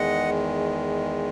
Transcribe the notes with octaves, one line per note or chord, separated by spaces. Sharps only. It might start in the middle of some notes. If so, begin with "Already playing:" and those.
Already playing: E2 D#3 G#3 D#5 F#5